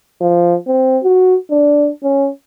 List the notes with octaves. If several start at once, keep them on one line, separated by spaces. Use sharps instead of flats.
F3
C4
F#4
D4
C#4